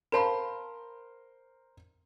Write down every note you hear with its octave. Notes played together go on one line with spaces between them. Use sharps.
A#4 C5 F5 A5 B5 C6